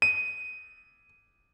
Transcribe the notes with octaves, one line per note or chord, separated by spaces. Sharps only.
D#7